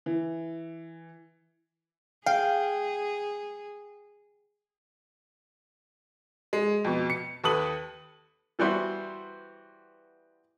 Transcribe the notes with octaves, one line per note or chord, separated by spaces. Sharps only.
E3
G#4 F5 G5
G#3
F2 B2
C#7
D#2 A4 B4 D#6 F#7
E3 G3 B3 F#4 C5 E5